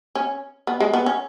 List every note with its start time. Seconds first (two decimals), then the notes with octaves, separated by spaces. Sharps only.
0.15 C#4
0.67 B3
0.80 G#3
0.94 B3
1.06 C#4